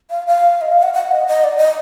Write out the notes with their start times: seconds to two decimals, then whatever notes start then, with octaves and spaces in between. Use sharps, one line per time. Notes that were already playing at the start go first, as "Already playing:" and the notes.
0.10 F5
0.27 F5
0.61 D#5
0.72 F5
0.83 F#5
0.94 F#5
1.12 D#5
1.28 D#5
1.44 D5
1.57 D#5